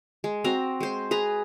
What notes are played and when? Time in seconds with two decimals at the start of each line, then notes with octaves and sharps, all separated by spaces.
0.24 G#3
0.44 C4 F#4 C5 A#5
0.80 G#3 C5
1.11 G#4 B4 A#5